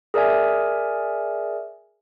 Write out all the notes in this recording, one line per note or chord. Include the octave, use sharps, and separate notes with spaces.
G#4 A#4 D5 E5 G#5